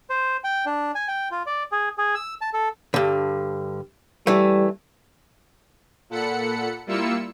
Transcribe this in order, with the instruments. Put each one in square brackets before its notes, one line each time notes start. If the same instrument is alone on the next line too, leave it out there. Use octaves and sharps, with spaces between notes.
[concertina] C5
G5
D4
G#5
G5
F4
D5
G#4
G#4
E6
A5
A4
[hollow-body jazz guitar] G2 D3
[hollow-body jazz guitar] E3 A3 [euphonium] G3
[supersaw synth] A#2 A4 F#5 B5 C#7
G3 A#3 E4 F4 E6 C#7